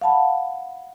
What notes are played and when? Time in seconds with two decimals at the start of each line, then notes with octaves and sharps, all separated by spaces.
0.01 F5 F#5 A5 B5